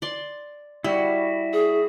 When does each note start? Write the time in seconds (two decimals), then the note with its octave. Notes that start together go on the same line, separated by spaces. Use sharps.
0.02 D5 C6
0.84 G3 E4 F#4
1.53 G#4